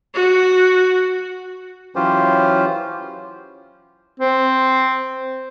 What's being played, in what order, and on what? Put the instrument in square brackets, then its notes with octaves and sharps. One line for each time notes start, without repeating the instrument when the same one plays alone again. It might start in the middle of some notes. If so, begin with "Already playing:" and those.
[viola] F#4
[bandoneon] E3 F#3 C#4 F4 G4 C5
[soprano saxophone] C4